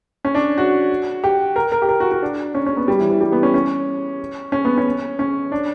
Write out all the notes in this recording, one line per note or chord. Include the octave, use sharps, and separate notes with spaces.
C#4
D4
F#4
G4
A#4
A#4
G4
A#4
F#4
F#4
D4
C#4
C#4
B3
G3
E3
E3
G3
B3
C#4
C#4
C#4
B3
C#4
C#4
D4